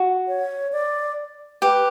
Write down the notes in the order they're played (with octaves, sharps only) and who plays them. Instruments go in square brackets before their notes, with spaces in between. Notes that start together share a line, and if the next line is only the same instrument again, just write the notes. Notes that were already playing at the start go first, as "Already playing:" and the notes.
Already playing: [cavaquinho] F#4
[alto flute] C#5
D5
[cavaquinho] G4 [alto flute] B4